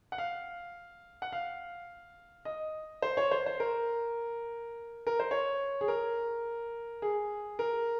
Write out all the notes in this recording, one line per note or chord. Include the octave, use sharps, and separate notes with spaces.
F#5
F5
F#5
F5
D#5
C5
C#5
C5
C5
A#4
A#4
C5
C#5
G#4
A#4
G#4
A#4